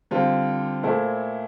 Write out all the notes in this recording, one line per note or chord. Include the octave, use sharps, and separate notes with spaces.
D3 G3 C4 F4 C5
A#2 A3 E4 A4 C5